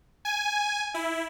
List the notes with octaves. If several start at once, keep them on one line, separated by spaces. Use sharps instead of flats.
G#5
E4